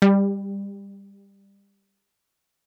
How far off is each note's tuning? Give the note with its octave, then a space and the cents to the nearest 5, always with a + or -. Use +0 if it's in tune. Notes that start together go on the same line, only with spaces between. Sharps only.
G3 +20